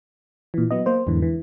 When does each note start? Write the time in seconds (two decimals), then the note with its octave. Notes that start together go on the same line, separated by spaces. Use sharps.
0.54 A#2 E3
0.71 F#3 B3 D#5
0.86 A#3 C5
1.07 E2 G#2 D3 E3
1.22 E3